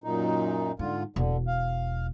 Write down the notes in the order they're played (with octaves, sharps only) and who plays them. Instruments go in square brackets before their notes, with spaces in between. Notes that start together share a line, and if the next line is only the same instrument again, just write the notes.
[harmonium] F#2 A#2 D#4
[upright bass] G#2 [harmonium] D3 F4
[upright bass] E1 [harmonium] D3
[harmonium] F5